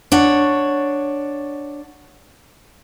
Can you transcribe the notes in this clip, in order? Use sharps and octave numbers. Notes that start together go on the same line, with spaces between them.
D4 C#5 F#5